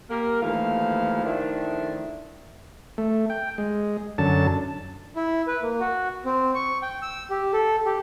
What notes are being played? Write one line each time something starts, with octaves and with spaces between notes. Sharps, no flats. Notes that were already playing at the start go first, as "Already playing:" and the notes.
A#3 G4 A#4
D#2 E3 F3 A3 F5
D#3 F3 A3 D4 E4
A3
G5
G#3
F#2 D3 A5
E4
B4
A#3
F#4
C4
C#6
G5
E6
G4
A4
G4